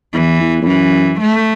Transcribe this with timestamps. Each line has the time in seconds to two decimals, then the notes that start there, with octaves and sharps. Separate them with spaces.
0.13 E2 E3
0.40 E2
0.61 E2
0.67 F#2 E3
1.21 A3